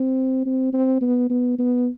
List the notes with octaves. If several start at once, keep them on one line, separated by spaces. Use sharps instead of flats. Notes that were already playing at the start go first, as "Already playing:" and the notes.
Already playing: C4
C4
C4
B3
B3
B3